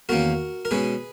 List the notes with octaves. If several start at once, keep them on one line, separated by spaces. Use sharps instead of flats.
E2 D#3 A#3 C#4 F#4 A#4
A#4
B2 G#3 C#4 G#4 B4